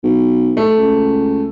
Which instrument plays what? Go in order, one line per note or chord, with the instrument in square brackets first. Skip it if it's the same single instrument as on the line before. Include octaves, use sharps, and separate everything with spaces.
[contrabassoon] B1
[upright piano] A3
[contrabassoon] C#2